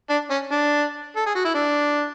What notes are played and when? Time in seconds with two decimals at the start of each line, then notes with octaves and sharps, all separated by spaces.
0.10 D4
0.31 C#4
0.52 D4
1.16 A4
1.26 G#4
1.35 F#4
1.45 E4
1.55 D4